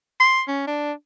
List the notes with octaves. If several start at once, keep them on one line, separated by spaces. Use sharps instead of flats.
C6
C#4
D4